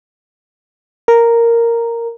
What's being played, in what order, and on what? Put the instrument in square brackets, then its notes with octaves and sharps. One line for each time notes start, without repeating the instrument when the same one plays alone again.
[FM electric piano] A#4